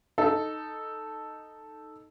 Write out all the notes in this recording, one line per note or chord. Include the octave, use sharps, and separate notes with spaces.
D#4 A4